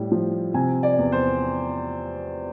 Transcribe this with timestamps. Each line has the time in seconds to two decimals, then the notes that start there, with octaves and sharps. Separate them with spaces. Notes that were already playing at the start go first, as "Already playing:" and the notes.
Already playing: A2 G3
0.11 F3
0.54 C3 G#5
0.83 D5
0.98 E2
1.12 C5